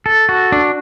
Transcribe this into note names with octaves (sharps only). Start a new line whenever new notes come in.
A4
F#4
D4